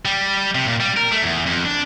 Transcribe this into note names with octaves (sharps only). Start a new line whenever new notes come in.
G3
C3
A#2
G3
A#4
A3
E2
F2
D4